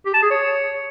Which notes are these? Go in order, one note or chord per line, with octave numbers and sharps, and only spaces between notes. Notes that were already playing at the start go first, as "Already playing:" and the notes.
G4
A5
G#4
C#5